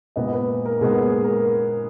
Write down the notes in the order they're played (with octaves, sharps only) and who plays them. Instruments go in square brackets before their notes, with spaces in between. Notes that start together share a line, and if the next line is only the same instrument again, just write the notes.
[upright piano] A#2 G#3 B3 D#5
B4
A#4
A#2 G#3 B3 G#4
G#4
A#4